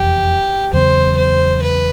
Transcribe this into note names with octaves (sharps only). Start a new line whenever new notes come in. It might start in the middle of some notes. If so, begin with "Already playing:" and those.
Already playing: F1 E2 G4
E2 C#3 F#3 B3 C5
C5
B4